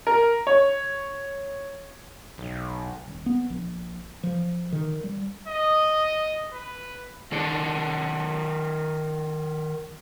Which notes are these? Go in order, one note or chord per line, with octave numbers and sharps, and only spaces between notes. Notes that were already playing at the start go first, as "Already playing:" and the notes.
A#4
C#5
B1
D#1
B3
A#1
F3
D#3
G3
D#5
B4
D#3 A4 D5